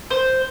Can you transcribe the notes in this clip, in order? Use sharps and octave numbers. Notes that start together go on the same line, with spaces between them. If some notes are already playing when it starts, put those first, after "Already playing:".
C5